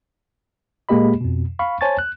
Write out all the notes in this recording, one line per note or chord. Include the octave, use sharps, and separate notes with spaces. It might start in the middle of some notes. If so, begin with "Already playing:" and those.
A#2 G#3 A#3 G4 D#5 B5
F2 B2
F5 B5 C#6
C5 C#5 G#5 A5 C#6 A6
F#6